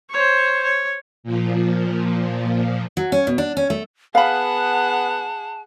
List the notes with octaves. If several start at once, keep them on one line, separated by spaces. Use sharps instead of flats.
C5 C#5
C#5
A#2 F3
F#3
C#4
B2
D4
C#4
A3
B3 G#4 F5 F#5 A5 B5